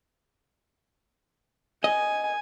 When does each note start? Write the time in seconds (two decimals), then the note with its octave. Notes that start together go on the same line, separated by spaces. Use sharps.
1.84 D#5 G#5